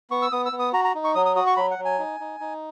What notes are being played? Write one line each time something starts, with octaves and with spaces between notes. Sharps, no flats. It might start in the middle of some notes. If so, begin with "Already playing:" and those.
B3 C#6
E6
B3 D#6
E6
B3
D#6
F#4 A#5
A#5
D#4
C#6
F#3 D#6
D#6
F#4 D#6
C#6
F#3 B5
F#5
F#3
G#5
D#4
D#4
D#4